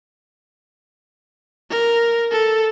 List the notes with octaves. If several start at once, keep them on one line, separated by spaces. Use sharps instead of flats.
A#4
A4